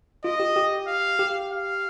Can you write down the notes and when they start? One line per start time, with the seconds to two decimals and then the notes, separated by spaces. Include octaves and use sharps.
0.24 F4 D#5
0.40 G4
0.56 G4
0.88 F5
1.19 G4
1.52 F5